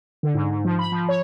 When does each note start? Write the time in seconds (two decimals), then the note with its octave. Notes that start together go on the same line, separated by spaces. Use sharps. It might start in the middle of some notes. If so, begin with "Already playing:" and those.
0.23 D3
0.34 G#2
0.51 G#2
0.65 F3
0.79 B5
0.92 F3
1.09 C#5